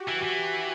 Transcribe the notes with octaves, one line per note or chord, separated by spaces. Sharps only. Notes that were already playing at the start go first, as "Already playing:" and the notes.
Already playing: F#4 G4
E3
E3